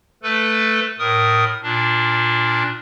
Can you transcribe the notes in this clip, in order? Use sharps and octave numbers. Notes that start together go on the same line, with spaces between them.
A3 A4 B4
A2 A#4 D#6
A#2 D4